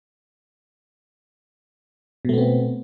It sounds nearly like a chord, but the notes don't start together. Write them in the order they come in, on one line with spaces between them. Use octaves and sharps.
B2 A3 B3 C4